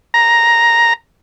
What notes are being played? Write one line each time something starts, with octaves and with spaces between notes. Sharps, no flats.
A#5